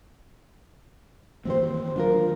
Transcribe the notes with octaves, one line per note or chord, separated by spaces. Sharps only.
D#3 E3 A#3 C4 G4 C5
D#3 F#3 D4 F4 A#4